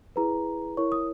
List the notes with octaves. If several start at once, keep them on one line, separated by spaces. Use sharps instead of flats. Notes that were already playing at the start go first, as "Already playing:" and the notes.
E4 G#4 B4 A#5
E4 A#4 C#5 C#6
D#6